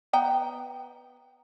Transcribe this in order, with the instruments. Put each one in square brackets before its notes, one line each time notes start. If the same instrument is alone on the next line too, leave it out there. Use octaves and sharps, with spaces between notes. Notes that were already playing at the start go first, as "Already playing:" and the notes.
[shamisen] B3 G5 A#5